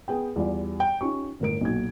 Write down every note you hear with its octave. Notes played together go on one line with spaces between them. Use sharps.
B3 G#4 G5
E2 G3 F4 D5
G5
C#4 D#4 F4 G4 C#6
G1 A2 A#4 D7
B1 A#2 D#4 F#4 G#6